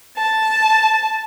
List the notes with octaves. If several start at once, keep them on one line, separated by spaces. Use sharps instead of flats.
A5